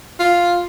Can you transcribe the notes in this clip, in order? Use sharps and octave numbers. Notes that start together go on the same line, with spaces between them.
F4